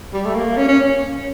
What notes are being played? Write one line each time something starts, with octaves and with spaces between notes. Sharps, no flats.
G3
A3
A#3
C#4
C#4